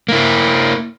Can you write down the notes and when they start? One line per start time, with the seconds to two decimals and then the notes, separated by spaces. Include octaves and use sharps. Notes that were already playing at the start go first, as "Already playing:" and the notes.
0.09 A#3 E4